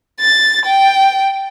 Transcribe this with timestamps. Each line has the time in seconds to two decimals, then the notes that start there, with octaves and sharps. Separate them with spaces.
0.20 A6
0.66 G5